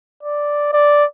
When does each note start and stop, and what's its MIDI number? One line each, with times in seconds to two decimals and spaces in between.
0.23 0.69 74
0.73 1.05 74